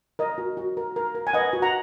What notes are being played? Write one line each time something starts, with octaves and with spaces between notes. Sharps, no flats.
A#4 D#5
F#4
F#4
A#4
A#4
A#4
G#5
B4 D#5 F#5
F#4
F#5 A#5